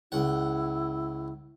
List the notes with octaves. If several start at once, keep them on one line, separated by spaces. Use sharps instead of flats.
C#2 E4 F#5